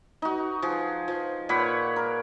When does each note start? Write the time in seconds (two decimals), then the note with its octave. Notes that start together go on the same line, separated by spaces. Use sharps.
0.22 D#4 F#4
0.62 F3 G#4
1.08 F3
1.49 A#2 C#5 F#5 B5
1.96 A#4